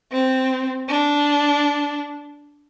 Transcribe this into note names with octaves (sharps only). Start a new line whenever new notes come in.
C4
D4